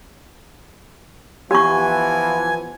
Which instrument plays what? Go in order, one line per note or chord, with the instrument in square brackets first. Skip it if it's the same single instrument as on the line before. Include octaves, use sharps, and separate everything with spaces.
[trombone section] E3 F3 [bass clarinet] B3 [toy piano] G4 C#6 [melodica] G#5